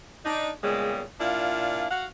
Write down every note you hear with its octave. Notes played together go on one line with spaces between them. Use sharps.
D4 D#4
A#2 C#3 G3 G#3 B3
A#2 D4 E4 F4 F5
F#4 F5 F#5